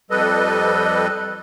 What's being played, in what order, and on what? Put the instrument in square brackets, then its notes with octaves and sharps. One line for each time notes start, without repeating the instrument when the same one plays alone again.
[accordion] F2 G3 A4 B4 D#5